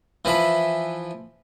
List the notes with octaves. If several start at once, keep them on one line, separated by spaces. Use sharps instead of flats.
E3 F3 B5